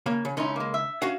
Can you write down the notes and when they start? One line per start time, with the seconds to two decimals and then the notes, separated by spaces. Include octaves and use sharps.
0.06 C#3 A#3 F5
0.25 C#3
0.37 C#2 C#4 D#4 E4 C6
0.56 G#3 A#3
0.74 E5
1.02 C#4 F#4 F5 F#5